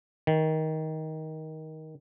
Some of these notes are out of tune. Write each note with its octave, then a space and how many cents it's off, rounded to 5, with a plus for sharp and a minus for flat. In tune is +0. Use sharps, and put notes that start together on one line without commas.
D#3 +15